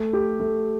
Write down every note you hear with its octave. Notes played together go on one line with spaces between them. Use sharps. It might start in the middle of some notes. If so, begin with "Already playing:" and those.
Already playing: A3
G4
A3